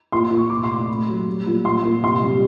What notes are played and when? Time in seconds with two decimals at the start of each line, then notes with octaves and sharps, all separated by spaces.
0.12 A#2 C6
0.31 A#2
0.37 C#6
0.50 C3 D6
0.64 C6
0.69 A3
0.88 A3 B5
1.08 F#3
1.26 G3
1.46 A#2
1.64 A#2 C6
1.83 A#2
2.03 C3 C6
2.23 G3